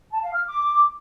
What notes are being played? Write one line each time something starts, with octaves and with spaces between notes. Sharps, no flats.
A5
F5
F6
D6